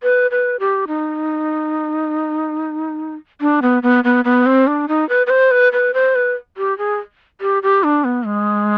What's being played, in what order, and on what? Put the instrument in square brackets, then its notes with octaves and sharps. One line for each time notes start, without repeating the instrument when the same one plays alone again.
[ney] B4
B4
G4
D#4
D4
B3
B3
B3
B3
C4
D4
D#4
B4
B4
C5
B4
B4
C5
B4
G4
G#4
G4
G4
D4
B3
G#3